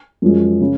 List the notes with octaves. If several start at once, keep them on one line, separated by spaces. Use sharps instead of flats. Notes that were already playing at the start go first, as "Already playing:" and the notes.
F#2 F3 G#3
C#3